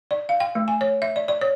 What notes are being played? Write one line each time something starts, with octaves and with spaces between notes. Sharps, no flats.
D5
F5
G5
A3
G#5
C#5
E5
D5
D5
C#5